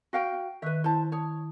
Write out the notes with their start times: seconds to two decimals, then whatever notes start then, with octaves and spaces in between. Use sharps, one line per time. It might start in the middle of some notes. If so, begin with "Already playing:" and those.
0.13 F#4 F5 G5
0.62 D#3 B4 E5 C#6 F#6
0.84 E4 C5 A5
1.12 C#5 A5 D#6